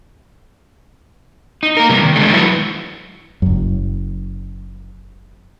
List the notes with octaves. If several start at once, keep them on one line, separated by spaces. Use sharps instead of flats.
D#4
A#3 A#4
C3 E3 G3
D#3
D3 G#3 A3
F#3 E4 F#4 B4
F#1 F#2